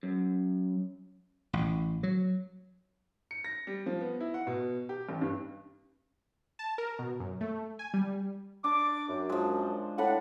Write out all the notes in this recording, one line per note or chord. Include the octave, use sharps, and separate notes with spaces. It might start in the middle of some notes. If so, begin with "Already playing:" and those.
F#2
A1
F#3
C#7
A#6
G3
F3
B3
E4
F#5
B2
G4
A1
G2
A5
A#4
B2
F#2
A3
G#5
G3
D4 D6
F#2
F3 G#3
A2 D4 B4 F#5